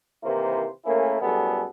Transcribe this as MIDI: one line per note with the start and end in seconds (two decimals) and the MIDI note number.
0.24 0.67 48
0.24 0.67 51
0.24 0.67 52
0.24 0.67 58
0.24 0.67 64
0.24 0.67 72
0.85 1.20 57
0.85 1.20 58
0.85 1.20 61
0.85 1.20 64
0.85 1.20 68
0.85 1.20 70
1.21 1.65 42
1.21 1.65 45
1.21 1.65 55
1.21 1.65 59
1.21 1.65 68
1.21 1.65 69